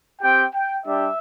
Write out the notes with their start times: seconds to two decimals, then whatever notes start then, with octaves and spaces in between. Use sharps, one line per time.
0.21 C4 G4 G5
0.54 G5
0.85 G3 D4 G4 E5